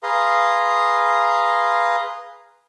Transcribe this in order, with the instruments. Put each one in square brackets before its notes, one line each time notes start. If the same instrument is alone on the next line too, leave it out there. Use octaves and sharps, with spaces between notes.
[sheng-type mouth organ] G#4 B4 F5 A#5 C6